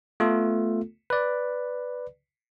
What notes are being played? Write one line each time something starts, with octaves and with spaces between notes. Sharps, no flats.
A3 B3 F4 A4
B4 D5